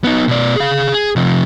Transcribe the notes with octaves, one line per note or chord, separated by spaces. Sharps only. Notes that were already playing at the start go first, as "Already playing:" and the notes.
B3 D#4
B2 D5
G#4 F5
G#4
C3 F3